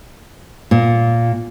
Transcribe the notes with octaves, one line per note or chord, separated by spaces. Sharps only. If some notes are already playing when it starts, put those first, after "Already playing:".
A#2